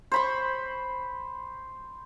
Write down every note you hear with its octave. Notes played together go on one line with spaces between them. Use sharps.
C5 B5 C#6